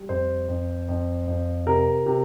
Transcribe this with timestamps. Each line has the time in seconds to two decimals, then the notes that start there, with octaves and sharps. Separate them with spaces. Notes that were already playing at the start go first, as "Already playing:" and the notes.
Already playing: G3
0.09 F2 C5
0.48 F2
0.88 F2
1.27 F2
1.66 C3 A#4
2.06 C3